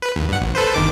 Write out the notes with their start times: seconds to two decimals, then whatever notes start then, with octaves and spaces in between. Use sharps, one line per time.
0.02 B4
0.16 D#2
0.29 G2 F#5
0.41 A#1
0.55 A4 B4 C5
0.74 G1 D#3 D6